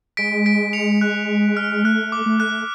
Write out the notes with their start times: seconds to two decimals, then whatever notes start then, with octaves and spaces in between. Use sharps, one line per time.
0.17 G#3 B6 D7
0.46 B6 D7
0.73 C#7 F7
1.01 F#6
1.57 F6
1.84 A3 F#6
2.12 D6
2.26 A3
2.40 F#6